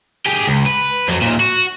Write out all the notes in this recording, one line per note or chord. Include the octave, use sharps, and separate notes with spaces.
G4 G#4
C#2
B4
F2 F#3
D#2 A#2
F#4